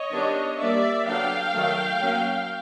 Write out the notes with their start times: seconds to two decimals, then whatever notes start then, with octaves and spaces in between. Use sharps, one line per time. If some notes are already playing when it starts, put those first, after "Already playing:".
Already playing: C#5 D#5
0.11 D#3 G3 B3 D4
0.59 G3 A#3 D4 D5 E5
1.06 D3 F#3 B3 D4 F5 G5
1.53 D#3 F#3 A3
2.01 F#3 A#3 C#4